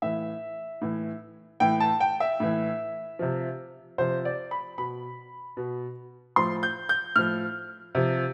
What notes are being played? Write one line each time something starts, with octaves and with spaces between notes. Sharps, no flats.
A2 E3 E5
A2 E3
A2 E3 G5
A5
G5
E5
A2 E3
C3 F3
C3 F3 C5
D5
B5
B2 B5
B2
A2 F3 C6
G6
G6
A2 F3 F6
C3 F3